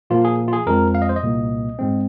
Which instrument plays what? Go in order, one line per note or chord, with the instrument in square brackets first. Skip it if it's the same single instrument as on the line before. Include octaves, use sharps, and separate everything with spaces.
[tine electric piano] A#2 F3 A#3 F4
G#4
F4
G#4
F2 F3 G#3 C4 A#4
F5
D#5
C5
D#5
C2 A#2 A#3
G#2 G#3 C4